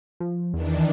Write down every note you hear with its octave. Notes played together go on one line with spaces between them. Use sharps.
F3
E2 D#3 E3 D4